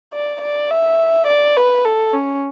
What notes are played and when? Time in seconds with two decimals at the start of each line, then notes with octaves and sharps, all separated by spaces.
0.14 D5
0.42 D5
0.71 E5
1.27 D5
1.57 B4
1.85 A4
2.14 C#4